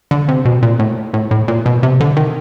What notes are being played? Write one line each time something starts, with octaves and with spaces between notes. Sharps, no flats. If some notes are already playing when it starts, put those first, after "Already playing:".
D3
C3
B2
A#2
A2
A2
A2
A#2
B2
C3
D3
D#3